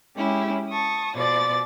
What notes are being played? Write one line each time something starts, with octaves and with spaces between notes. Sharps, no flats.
G#3 C#4 E4 G4
A5 C#6 D#6
B2 F3 D5 A6